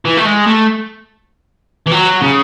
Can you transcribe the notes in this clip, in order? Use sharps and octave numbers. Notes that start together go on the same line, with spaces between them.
E3
A3
G#3
A3
E3
F#3
C#3